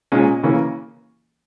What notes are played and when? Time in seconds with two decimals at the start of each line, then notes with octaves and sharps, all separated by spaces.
0.12 A#2 G#3 C#4
0.43 C#3 E3 A#3 C#4